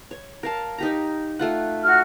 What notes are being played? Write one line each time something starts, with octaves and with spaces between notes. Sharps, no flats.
C#5
A#4 F5 A5
D#4 G4 A#5
A3 F4 F#5
F#4 F6